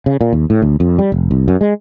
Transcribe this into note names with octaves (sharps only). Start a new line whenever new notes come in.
C#3
A#2
D#2
A2
D2
F2
G3
F1
C2
F#2
G#3